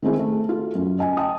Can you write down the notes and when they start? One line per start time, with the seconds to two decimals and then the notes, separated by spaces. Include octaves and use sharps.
0.02 D#3 G#3 C4 E4 G#4
0.19 A3
0.49 F4 F#4 A4
0.75 F#2
0.99 D#5 G#5
1.17 D#5 G5 A5 D#6